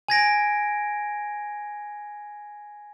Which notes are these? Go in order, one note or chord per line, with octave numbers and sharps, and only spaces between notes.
G#5 G#6 A#6 D7